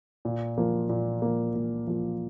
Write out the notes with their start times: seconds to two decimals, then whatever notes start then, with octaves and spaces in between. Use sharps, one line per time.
0.25 A#2
0.58 F3 A#3
0.89 A#2
1.22 F3 A#3
1.56 A#2
1.87 F3 A#3